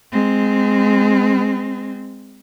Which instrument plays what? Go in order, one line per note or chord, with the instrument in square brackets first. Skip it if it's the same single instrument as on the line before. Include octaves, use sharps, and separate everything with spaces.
[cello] G#3 C4